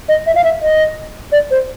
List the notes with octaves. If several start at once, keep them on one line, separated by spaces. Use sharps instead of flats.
D#5
E5
F5
E5
D#5
D5
C5